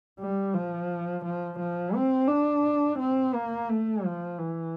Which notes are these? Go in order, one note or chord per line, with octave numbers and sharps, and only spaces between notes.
G3
F3
F3
F3
C4
D4
C4
A#3
A3
F3
E3